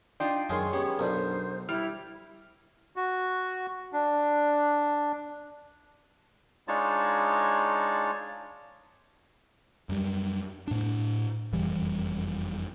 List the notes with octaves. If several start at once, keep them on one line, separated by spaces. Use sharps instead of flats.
D4 D#4 F4 D5 G5 C6
F#2 D#3 G#3 C#5 G#5 C6
B3 C#4 G4
B1 D4 A#4 C5
G3 E4 F6
F#4
D4
G#3 D4 D#4 F4 C#5 A5
F#2 G3
A2 D4
F#1 F2 E3 G3